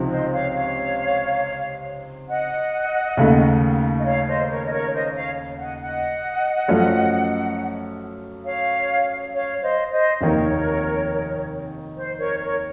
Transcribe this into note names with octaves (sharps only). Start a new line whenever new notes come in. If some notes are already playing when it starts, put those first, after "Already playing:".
Already playing: C#2 C3 F3 C4 D#4
C5 D#5
C#5 F5
C#5 F5
D#5 F#5
D#2 C#3 A3
D#5
C#5 F5
C5 D#5
A#4 C#5
D#5
A#4 C#5
C5 D#5
C#5 F5
D#5 F#5
D#5 F#5
F#2 F3 A3 C#4
C#5 F5
C#5 F5
C5 D#5
C5 D#5
F1 D#2 D#3 A#4 C#5
C5
A#4 C#5
A#4 C#5